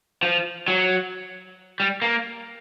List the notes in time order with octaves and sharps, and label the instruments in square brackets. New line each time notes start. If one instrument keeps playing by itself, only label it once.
[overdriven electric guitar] F3
F#3
G3
A#3